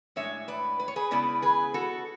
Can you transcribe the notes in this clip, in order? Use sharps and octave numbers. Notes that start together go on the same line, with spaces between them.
A2 G#3 D4 C#5 E5
B4 D5
B4
C#5
G#4 B4
C#3 G#3 B3 E4 B4 D5
G#4 B4
F#4 A4